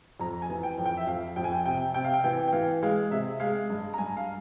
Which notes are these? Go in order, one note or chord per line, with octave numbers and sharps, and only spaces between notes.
F2 A#5
G#5
E3
G5
F2
G5
E5
F2 F5
F2 G5
G#5
G5
C3 G5
C3 G5
F5
G5
E3 G5
G5
E3 F5
G#3 F5
C3 E5
G#3 F5
G2
A#5
G2 G#5
F5